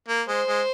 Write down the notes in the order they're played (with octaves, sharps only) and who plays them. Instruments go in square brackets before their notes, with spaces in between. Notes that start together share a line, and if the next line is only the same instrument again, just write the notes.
[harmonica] A#3
[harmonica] G#3 [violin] C5
[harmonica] G#3